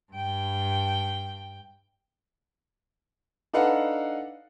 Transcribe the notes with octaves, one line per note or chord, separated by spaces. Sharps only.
G2 G5
D4 D#4 A4 B4 F5 F#5